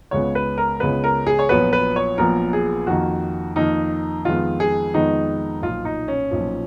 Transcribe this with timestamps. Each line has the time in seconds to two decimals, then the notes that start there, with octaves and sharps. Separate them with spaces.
0.11 C#2 C#3 G#3 B3 C#5
0.35 B4
0.58 A#4
0.80 C#2 C#3 G#3 B3 B4
1.04 A#4
1.27 G#4
1.39 C#5
1.49 A#1 A#2 F#3 B3 B4
1.73 B4
1.96 C#5
2.18 A#1 A#2 F#3 B3 A#4
2.53 G#4
2.87 F2 D#3 A#3 F#4
3.56 F2 D#3 A#3 D#4
4.25 F2 D#3 G#3 B3 F4
4.60 G#4
4.94 F2 D#3 G#3 B3 D#4
5.62 B1 A#2 F3 F4
5.85 D#4
6.08 C#4
6.31 B1 A#2 F3